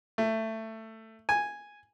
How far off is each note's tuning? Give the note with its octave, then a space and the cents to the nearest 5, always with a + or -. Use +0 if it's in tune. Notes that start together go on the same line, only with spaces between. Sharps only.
A3 +15
G#5 -5